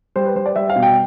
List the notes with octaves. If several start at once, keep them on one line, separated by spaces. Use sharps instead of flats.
G3 C5
B4
G3 C5
D5
G3 E5
F5
B2
G5